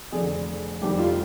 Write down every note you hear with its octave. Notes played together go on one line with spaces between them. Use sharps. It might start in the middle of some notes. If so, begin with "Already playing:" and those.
F1 F2 D3 G#4
F1 F2 D#3 G3 G4
F4